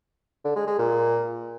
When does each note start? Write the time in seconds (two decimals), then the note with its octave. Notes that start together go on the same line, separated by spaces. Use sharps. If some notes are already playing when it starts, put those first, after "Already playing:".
0.44 D3
0.56 G#3
0.67 G#3
0.78 A#2